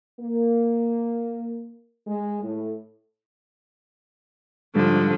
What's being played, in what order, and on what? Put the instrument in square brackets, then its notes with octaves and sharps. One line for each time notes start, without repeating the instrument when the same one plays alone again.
[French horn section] A#3
G#3
A2
[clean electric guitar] G#2 G3 [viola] D3 F3